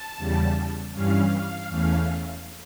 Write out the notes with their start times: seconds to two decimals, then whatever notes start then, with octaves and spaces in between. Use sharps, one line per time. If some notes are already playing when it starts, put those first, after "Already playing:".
Already playing: A5
0.17 E2 C#3 G3
0.92 G2 E3 G3 C#4 F5
1.69 E2 E3 A3 C#4